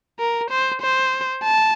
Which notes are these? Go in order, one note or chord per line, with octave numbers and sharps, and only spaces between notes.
A#4
C5
C5
A5